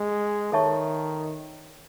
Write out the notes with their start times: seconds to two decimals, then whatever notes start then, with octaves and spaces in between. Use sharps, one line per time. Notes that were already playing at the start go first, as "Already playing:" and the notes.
Already playing: G#3
0.52 D#3 A4 C#5 E5 A5 C#6